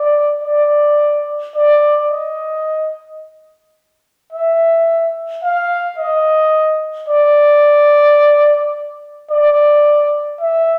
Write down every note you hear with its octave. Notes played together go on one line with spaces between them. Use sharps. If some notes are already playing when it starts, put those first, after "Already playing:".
Already playing: D5
D5
D5
D#5
E5
F5
D#5
D5
D5
E5